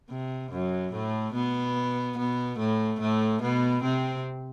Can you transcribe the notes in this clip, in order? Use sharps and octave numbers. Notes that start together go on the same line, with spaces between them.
C3
F#2 F#3
A2 A3
B2 B3
B2 B3
A2 A3
A2 A3
B2 B3
C3 C4